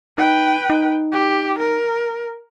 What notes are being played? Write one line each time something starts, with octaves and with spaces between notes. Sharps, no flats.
D#4 B4 G5
D#4
G4
A#4